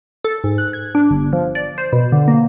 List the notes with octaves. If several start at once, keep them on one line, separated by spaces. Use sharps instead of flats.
A4
G#2
F#6
G#6
D4
G1
F3
D5
C5
B2
D3
A#3